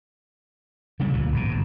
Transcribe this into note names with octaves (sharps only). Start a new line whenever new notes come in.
C#3 G3 A#3
D2 A#2 C#3 F3
A#1 G2 B2
G1 G#2